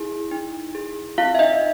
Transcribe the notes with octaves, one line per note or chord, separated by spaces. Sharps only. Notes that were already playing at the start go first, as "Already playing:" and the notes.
Already playing: E4 G#4
D#4
G#4
C4 F4 F5
E5
D#4 D#5